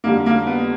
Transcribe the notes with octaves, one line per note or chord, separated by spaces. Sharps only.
F2 D3 G3 A#3
A#3
B3